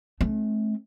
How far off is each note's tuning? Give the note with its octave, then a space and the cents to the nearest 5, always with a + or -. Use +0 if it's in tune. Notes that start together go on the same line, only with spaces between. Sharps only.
A3 -35 C4 +40